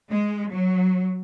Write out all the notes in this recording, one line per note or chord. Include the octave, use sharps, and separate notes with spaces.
G#3
F#3